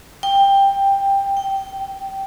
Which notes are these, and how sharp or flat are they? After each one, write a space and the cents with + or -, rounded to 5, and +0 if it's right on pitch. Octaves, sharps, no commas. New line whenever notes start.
G5 +10
G5 -10